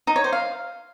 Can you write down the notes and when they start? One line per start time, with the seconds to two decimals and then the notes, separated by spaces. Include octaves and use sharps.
0.07 D#4
0.16 C#5
0.24 C5
0.33 F5